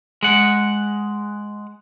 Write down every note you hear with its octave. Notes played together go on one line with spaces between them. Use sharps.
G#3 F#5